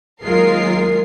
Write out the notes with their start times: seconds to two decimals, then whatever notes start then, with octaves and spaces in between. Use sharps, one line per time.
0.22 D#2 F#3 G#3 F4 A#4 C7